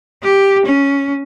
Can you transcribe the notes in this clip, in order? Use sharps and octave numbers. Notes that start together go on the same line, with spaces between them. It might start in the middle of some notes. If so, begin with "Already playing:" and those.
G4
C#4